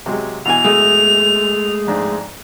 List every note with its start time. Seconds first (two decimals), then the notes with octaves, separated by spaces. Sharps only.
0.06 C3 F#3 G#3
0.45 B2 E3 G#5 F7
0.65 G#3 A3
1.87 F2 G#2 D4